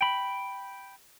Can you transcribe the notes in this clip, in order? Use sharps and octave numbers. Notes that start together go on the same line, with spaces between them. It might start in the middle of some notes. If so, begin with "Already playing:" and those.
G5 B5